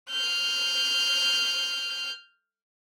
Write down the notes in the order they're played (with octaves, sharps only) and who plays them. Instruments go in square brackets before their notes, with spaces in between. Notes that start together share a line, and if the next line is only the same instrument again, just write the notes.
[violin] F6 G6